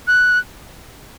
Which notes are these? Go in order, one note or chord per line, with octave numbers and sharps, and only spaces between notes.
F#6